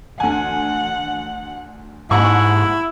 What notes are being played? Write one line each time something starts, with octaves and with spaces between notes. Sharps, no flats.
D2 F#5 G#5
D#2 G#2 E4 F#5 C#6